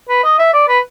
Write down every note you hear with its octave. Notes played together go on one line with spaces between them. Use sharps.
B4
D#5
E5
D5
B4